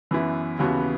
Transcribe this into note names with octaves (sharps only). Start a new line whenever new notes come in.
F#2 E3 B3 E4
D#2 C#3 E3 B3 F#4